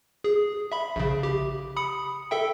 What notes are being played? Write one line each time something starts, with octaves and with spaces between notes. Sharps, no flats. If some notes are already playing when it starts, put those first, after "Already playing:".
G#4
E5 B5
A#1 C#3
G4
B5 D#6 C#7
A4 E5 G5